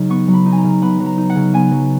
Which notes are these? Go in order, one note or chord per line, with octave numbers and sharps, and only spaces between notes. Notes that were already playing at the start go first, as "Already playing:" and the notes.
Already playing: C#3 F#3 D#4
B3 C#6
F#3
B5
D#4
G#5
A#5
C#3
B3 B5
F#3
A#5
D#4
F#5
C#3
B3 G#5
F#3